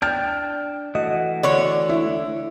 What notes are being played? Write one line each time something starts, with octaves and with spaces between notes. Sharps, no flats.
D4 G5 A5 F6
E3 A3 F#4 D#5
D3 C#5 D5
E4